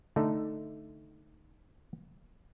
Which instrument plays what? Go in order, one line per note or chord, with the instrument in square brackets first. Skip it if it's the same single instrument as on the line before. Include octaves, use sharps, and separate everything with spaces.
[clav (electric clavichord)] D3 A3 D#4 A4